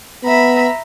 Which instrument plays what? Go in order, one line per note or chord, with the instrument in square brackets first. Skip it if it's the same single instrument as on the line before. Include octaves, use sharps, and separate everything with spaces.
[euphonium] B3 [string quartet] E5 A#5 B5